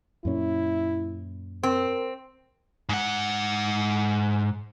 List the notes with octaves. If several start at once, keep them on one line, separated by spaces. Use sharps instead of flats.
F#2 A#2 C#4 E4
C4 A#4
G#2 F#5